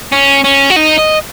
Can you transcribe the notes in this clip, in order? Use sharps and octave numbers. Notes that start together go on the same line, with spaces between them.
C#4
C#4
F#4
D#4
D#5